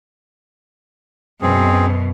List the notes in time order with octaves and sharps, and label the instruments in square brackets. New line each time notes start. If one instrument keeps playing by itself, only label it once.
[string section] F#2 B2 [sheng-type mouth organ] C4 G#4